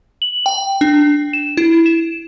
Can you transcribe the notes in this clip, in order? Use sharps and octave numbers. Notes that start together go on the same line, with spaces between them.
F#7
G5
D4
E7
E4
E7